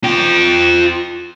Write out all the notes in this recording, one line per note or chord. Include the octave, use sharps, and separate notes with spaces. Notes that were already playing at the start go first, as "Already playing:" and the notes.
F4 G5